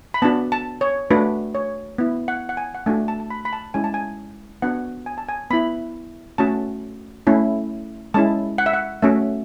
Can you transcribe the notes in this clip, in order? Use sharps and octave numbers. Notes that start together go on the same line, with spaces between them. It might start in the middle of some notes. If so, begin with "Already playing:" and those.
B5
B3 D4 F#4 A5
A5
C#5
A3 D4 F#4 B4
C#5
B3 E4
F#5
F#5
G#5
F#5
A3 D4 F#4 G#5
A5
A5
B5
B5
A5
G#3 C#4 E4 G#5
A5
G#5
B3 D4 F#4 F#5
G#5
A5
G#5
B3 E4 B5
A3 C#4 F#4 A5
A3 C#4 E4
G#3 C#4 E4 A5
F#5
E5
F#5
A3 C#4 F#4 E5